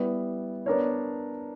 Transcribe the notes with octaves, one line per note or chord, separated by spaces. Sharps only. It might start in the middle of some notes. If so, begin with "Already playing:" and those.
Already playing: G3 B3 E4
B3 D4 A#4 C#5